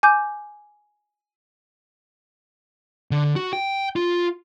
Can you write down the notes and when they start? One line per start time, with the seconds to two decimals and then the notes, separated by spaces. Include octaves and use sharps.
0.03 G#5 D6 G6
3.11 D3
3.36 F#4
3.53 G5
3.96 F4